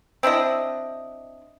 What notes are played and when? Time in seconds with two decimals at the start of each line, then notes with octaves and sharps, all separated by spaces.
0.23 C4 D4 E4 D#5